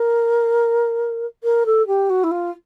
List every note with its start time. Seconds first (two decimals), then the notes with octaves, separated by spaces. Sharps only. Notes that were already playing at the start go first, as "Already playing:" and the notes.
Already playing: A#4
1.43 A#4
1.66 A4
1.87 G4
2.09 F#4
2.23 E4
2.31 F4